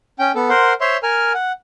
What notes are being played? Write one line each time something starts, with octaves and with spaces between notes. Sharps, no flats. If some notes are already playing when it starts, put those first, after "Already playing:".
C#4 G5
B3 A4
A#4 C5 F#5 C6
C5 C#5 E5 C6
A#4 G#5 F6
F#5